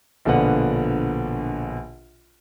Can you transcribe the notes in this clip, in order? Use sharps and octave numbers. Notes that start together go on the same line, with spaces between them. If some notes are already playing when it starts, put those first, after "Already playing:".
A#1 B2 D3 F4 B4 F#5